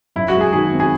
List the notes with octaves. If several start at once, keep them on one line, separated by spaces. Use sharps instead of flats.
F#2 E4
F#4
G#3
G#4
D#3 G#4
C4
G#4